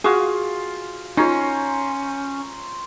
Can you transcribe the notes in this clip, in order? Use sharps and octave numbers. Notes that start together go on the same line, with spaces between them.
F4 F#4 G#4 F5
C#4 D#4 F4 C5 C#5 A#5